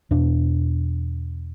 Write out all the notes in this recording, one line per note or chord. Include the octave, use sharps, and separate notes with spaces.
E2 B2 D4